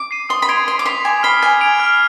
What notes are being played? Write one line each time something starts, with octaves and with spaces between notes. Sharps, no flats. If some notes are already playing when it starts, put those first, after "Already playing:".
Already playing: D6
C7 D#7
C6 D#6
B5
C6 G#6 D7 F7
C6 G#6
D6
C6 B6 F7
G#5 D6
B5 F6 C7 G7
G#5 G#6
D7 F7
F6